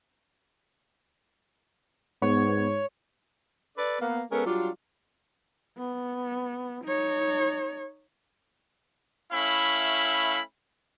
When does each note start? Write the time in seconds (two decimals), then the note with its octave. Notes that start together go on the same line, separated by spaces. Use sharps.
2.22 G#2 B3 C#5
3.77 A4 B4 D5
4.00 A#3 B3
4.31 G#3 B3 C#4 A4 A#4
4.46 F#3 G3 D4 F4
5.78 B3
6.84 D#4 C#5
9.33 A3 C#4 E4 E5 F5 B5